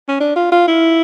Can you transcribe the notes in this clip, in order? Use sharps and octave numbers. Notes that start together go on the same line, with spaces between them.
C#4
D4
F4
F4
E4